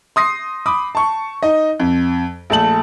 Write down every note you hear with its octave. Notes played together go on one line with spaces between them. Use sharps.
C6 D#6 A#6 C7
B5 D6 D#6
A5 C#6
D#4 D#5
F2
A#1 A3 A5 F#7